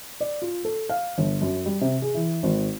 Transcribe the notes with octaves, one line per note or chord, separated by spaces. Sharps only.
D5
F4
A4
F5
G1
F#2
G3
C3
G#4
E3
G#1